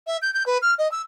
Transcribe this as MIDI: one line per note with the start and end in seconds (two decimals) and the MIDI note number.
0.07 0.17 76
0.22 0.33 91
0.34 0.45 91
0.46 0.58 71
0.62 0.74 89
0.78 0.90 75
0.91 1.02 88